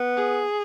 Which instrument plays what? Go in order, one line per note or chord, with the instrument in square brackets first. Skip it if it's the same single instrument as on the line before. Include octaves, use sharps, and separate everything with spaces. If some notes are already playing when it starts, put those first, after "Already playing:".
Already playing: [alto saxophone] B3
[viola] G#4